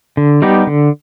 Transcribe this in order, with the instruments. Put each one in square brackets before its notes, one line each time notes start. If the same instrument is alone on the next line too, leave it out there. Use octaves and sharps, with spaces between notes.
[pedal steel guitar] D3
G3 B3 D#4 G4
D3